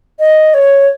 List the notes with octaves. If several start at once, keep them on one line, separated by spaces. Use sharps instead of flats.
D#5
C#5